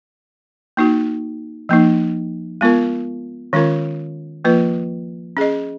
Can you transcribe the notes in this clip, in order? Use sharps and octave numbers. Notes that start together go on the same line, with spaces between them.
A#3 D#4 F#4
F3 A#3 D#4
G#3 B3 F4 A#4
D#3 G#3 C#4 F4 A#4
F3 A#3 F4 B4
C#4 G#4 D#5